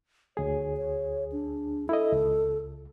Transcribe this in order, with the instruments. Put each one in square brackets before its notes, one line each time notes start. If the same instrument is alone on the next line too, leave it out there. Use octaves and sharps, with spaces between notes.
[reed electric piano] D2 G#4 [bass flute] C#5
[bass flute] C#5
D4
[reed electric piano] E4 D#5 [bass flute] A4
[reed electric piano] C#2